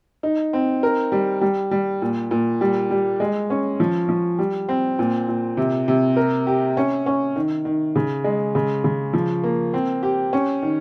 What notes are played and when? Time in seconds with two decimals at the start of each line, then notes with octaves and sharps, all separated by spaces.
0.23 D#4
0.53 C4
0.83 A#4
1.12 G3
1.41 G3
1.71 G3
2.02 A#2
2.31 A#2
2.61 G3
2.90 G3
3.20 G#3
3.50 C#4
3.80 F3
4.09 F3
4.39 G3
4.69 C4
4.99 A#2
5.28 A#2
5.57 C3
5.88 C3
6.16 A#4
6.47 G4
6.77 C#4
7.06 C#4
7.36 D#3
7.65 D#3
7.96 C#3
8.24 G#3
8.55 C#3
8.84 C#3
9.13 F3
9.44 A#3
9.74 C4
10.03 G4
10.33 C#4
10.62 D#3